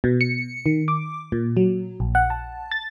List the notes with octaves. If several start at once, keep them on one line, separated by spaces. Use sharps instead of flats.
B2
C#7
D#3
D6
A#2
F#3
A#1
F#5
A5
A6